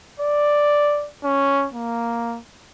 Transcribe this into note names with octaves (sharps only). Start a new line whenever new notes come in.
D5
C#4
A#3